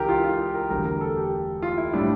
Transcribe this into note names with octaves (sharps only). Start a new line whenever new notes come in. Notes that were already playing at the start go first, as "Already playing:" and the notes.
Already playing: C#2 C#3 E3 G4 A#4
F4
F4
A#4
E1 D2 D3 G3 A#4
A#4
A4
G4
F4
E4
A2 G3 D4